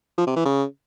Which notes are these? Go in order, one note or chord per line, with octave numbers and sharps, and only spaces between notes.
F3
C3
E3
C#3